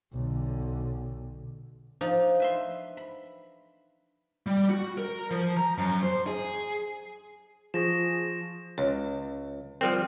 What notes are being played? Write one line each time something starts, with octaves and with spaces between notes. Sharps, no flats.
B1 D3
F3 D4 D#4
B4 E5 C6
B5
G3
F#4
A#4
F3
A#5
F#2
C5
G#4
F3 G#4 C#6 A#6 E7
C#2 C#5
F3 G3 C4 A#4